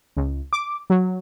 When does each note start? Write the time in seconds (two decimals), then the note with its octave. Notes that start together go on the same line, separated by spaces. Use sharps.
0.17 C#2
0.53 D6
0.90 F#3